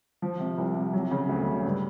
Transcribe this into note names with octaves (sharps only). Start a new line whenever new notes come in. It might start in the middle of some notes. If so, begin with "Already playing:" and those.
F3
C3
C2
C3
F#3
C#3
D2
C#3
G2